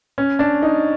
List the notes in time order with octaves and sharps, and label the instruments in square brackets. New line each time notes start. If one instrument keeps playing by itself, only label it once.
[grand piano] C#4
D4
D#4